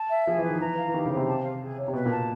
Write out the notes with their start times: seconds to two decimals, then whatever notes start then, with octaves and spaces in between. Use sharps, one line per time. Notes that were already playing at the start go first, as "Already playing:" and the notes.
Already playing: A5
0.10 E5
0.27 F3 G#4
0.38 E3
0.43 B4
0.49 D#3
0.61 E3 A#5
0.77 F5
0.88 E3
0.93 D#3 G4
1.05 C#3
1.11 C5
1.17 C3
1.27 A5
1.43 F5
1.61 G#4
1.78 C#5
1.88 C3
1.94 B2 B4
2.06 A#2
2.10 A5